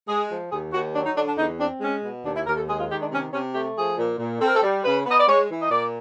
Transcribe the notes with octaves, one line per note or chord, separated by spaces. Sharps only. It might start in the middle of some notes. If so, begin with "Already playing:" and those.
G#3 G#4
F3
D#2 G#4
D#2 F#4
F#3 D4
D#4
D3 D4
D4
E2 D#4
C4 D4
G#3 C#4
B2
D#2 D4
E4
D#2 A#4
A4
G#3 G#4
F4
D#3 G4
D4
C3 C#4
C3 C#4
A3 G4
F3 G#4
A#2
A#2
C4 A4
A#4
A4
G3
C#3 B4
B3 D#5
D5
G#3 C#5
E3
D#5
A#2 D5